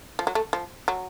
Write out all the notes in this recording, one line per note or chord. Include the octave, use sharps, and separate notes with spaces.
F3
F#3
A3
F3
F#3